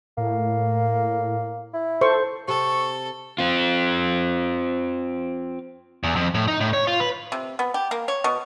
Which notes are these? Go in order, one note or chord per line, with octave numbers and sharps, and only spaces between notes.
A2 A#3
E4
A4 C5 C#6
C3 A4 C#6
C4 F4
E2
F2
A2
D#4
A2
C#5
F4
B4
C3
B3
G4
A#3
C#5
B2